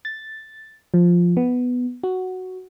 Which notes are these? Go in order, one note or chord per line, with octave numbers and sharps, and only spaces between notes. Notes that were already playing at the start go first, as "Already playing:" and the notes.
A6
F3
B3
F#4